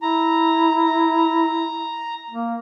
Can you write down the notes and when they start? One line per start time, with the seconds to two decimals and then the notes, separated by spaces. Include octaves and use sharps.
0.02 E4 A#5
2.30 A#3